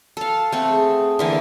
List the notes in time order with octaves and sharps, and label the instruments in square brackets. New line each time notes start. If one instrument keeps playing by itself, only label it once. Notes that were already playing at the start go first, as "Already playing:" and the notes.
[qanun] A4 F5
A3 C4 F#5
[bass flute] G#4
[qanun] D3 E3 A#3